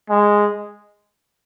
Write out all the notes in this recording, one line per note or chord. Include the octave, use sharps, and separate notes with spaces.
G#3